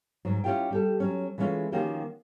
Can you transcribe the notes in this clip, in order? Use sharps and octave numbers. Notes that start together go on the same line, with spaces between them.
G#2 F#3
C#4 E4 F4 G4 G5
G3 G4 A4
F#3 C#4
E3 G#3 A3 C#4 F4
D#3 F3 A#3 C#4 F#4 G4